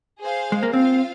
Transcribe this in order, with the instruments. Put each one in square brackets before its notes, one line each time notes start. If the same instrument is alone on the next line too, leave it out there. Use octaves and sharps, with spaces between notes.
[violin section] G#4 C5 F5
[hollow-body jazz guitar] G#3
A#3
[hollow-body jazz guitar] C4 [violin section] F4 C5 F5